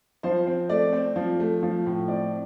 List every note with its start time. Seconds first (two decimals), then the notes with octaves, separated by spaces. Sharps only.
0.23 F3 C5
0.47 C4
0.69 A3 D5
0.93 C4
1.16 F3
1.40 A3
1.63 F3
1.86 A2
2.08 C4 D5